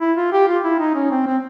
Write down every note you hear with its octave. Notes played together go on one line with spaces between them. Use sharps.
E4
F4
G4
F4
E4
D#4
C#4
C4
C4